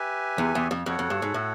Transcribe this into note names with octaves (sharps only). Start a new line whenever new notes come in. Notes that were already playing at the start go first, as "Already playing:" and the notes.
Already playing: G4 B4 E5 G#5
E2
E2
F2
F2 F#4 A4 C#5 F#5
F2
G2
G#2
A2